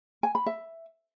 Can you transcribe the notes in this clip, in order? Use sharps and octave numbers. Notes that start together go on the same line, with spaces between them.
G#5
B5
E5